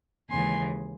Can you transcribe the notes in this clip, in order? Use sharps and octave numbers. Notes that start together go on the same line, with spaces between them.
D#2 C#3 E3 G#3 G#5 C6